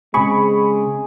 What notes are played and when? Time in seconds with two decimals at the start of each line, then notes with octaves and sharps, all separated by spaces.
0.14 C#3 G#3 C4 G#4 B5 C#6